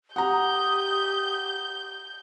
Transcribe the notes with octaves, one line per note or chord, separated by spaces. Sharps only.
G4 F#5 A#5 D#6 G6